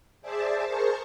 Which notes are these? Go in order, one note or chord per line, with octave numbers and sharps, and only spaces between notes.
G#4 C5 D5 E5 A5
G#4 A#4 C5 A5 C#6